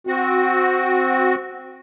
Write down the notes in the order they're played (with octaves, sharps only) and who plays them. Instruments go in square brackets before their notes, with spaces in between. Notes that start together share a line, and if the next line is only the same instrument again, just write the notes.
[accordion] C4 F#4